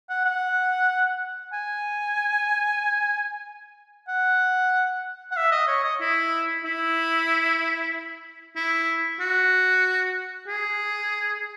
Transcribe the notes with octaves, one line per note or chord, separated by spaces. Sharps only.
F#5
F#5
G#5
F#5
F#5
E5
D#5
C#5
D#5
E4
E4
E4
F#4
G#4